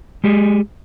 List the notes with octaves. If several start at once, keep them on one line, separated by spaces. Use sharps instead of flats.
G#3 G4 G#4